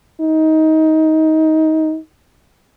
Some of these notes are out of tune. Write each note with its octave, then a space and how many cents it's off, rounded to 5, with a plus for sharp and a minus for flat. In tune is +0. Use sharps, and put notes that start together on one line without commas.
D#4 +20